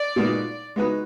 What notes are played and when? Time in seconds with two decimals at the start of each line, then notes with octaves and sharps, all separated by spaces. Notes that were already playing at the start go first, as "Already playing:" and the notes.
Already playing: D5
0.16 A#2 G#3 B3 D#4 F#4
0.76 G#3 B3 D#4 F#4 B4